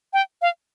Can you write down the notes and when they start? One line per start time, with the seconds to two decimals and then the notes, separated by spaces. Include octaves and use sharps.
0.13 G5
0.42 F5